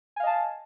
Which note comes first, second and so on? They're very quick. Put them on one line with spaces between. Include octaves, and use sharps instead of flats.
G#5 F5 D#5 A5